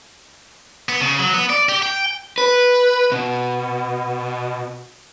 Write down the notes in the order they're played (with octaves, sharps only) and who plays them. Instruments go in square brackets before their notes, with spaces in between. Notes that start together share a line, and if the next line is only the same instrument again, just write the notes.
[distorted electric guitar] B3
C#3
F#3
B3
D5
G4
G5
[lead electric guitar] B4
B2